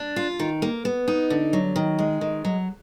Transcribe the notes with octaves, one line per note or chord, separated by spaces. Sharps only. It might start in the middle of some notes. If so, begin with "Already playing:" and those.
Already playing: D4
F4
D#3
A#3
B3
D#4
D3
F#3
D#3
G#3
D#3
F#3